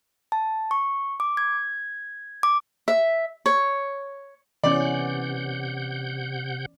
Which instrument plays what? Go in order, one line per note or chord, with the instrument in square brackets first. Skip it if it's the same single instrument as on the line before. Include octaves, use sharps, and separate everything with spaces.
[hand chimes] A5
C#6
D6
G#6
D6
[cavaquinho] E5
C#5
[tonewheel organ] C3 F#5 G6 [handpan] E3 B3 C#4 [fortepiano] D5